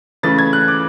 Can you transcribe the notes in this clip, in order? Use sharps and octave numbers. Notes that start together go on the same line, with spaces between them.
C#3 E3 A3 A6
G#6
F#6
D6